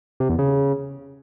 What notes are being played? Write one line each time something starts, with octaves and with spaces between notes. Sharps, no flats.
C3
E2
C#3